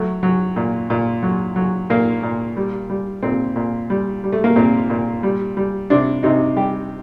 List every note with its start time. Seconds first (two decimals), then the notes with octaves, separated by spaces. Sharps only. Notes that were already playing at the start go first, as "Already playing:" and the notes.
Already playing: F#3 A3
0.23 F#3
0.56 A#2
0.90 A#2
1.23 F#3
1.56 F#3
1.90 A#2 A#3
2.23 A#2
2.57 G3
2.90 G3
3.23 A#2 C4
3.56 A#2
3.90 G3
4.24 G3
4.33 A3
4.44 A#3
4.56 A#2 C4
4.90 A#2
5.23 G3
5.57 G3
5.90 C3 D4
6.23 C3 D#4
6.56 G3 G4